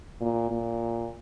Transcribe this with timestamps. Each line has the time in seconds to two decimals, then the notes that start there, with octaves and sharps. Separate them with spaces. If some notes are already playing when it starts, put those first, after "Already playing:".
0.21 A#2
0.51 A#2